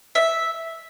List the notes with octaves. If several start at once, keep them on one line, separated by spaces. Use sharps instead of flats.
E5